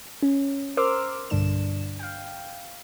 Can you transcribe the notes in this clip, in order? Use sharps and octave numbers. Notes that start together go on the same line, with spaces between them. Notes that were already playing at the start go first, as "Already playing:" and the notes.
C#4
A#4 C5 C6 D6 E6 F6
B1 G2 D3 D4 E7
F5 G5